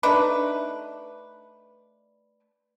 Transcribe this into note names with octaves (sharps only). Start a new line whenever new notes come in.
A3 D4 D#4 B4